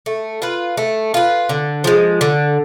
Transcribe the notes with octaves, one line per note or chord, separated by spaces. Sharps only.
A3
F4 B4
A3
F4 B4
D3
F3 G#3
D3